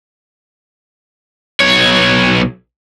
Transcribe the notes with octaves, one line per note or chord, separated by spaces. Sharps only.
B1 C#5